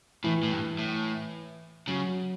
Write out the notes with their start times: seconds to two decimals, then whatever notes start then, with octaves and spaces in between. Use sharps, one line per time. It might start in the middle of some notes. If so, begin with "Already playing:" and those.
0.24 A2 E3
0.43 A2
0.51 G2
0.79 A2
1.88 C#3 F#3